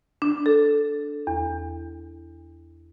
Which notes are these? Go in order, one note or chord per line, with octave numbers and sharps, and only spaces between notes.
D4
A4
E2